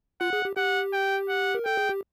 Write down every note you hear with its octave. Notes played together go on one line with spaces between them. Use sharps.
F4 F#5
G#4
G4
G4 F#5
G5
F#5
A#4
A4 G5
G#4
G4